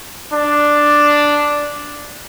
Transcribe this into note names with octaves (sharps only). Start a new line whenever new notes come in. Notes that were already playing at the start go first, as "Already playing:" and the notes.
D4